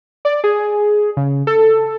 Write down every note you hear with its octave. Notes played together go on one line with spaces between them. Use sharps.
D5
G#4
C#3
A4